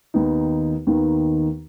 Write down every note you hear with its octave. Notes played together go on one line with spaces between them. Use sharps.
D#2 D#3 B3 D#4
D#2 D#3 B3 D#4